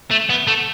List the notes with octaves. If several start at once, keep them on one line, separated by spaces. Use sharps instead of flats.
A3
B3
A3